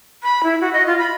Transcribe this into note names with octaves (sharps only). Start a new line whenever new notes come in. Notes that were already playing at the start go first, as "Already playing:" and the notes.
B5
E4
F#4
D#5
F4
B5